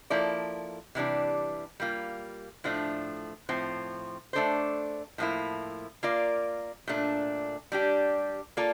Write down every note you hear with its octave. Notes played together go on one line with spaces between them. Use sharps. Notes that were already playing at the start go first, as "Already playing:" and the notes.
F3 A#3 E4 A4 D5
C3 E3 G3 D4
G3 A#3 F4
A2 F3 A3 D4
A2 F3 C4
A3 D4 A4 C5
A2 F3 A#3 E4
A#3 F4 A#4 D5
A#2 A3 D4
G3 D4 G4
A#3 F4 A4 D5